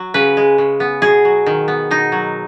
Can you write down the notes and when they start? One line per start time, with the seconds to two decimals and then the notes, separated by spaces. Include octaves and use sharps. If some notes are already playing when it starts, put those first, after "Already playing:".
Already playing: F#3
0.14 C#3 B4
0.37 G#3
0.58 C#3
0.80 B3
1.02 B2 G#4
1.25 F#3
1.46 D#3
1.68 B3
1.91 B2 D#4
2.12 F#3